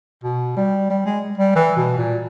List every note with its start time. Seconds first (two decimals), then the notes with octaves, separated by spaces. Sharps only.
0.24 B2
0.57 G3
0.90 G3
1.06 G#3
1.38 G3
1.55 E3
1.77 B2
1.98 A#2